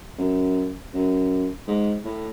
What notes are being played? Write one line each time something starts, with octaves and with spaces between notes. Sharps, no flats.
F#2
F#2
G#2
A2